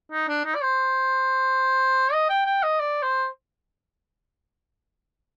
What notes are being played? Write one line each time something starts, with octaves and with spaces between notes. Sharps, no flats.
D#4
D4
D#4
D5
C5
D#5
G5
G5
D#5
D5
C5